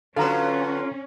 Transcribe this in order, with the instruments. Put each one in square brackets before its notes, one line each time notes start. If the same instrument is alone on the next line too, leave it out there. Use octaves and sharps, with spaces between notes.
[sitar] D3 F#3 B4 [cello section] C#4 [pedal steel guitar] F4 [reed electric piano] A4 F5 A#5